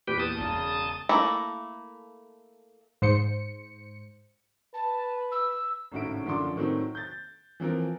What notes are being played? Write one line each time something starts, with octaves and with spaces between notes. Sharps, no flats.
E2 A#2 G4 B4 G5
A5 D#6
E1 C#3
A3 A#3 E4 A4 A#4
G#2 C5 C#7
B4 A5
E6
G#1 A2 C#3 F#4 E5 D7
F#2 D3 F3 C6 D6
A2 D#3 F#3 C4
G6 A6
E3 F3 C4 A#4